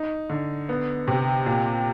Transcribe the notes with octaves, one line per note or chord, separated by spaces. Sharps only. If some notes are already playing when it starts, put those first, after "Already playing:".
Already playing: D#4
D3
B3
C3
A#2